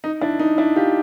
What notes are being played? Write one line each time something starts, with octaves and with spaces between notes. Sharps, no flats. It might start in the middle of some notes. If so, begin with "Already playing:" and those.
D#4
D4 E4
D#4
D4 E4
F4 G4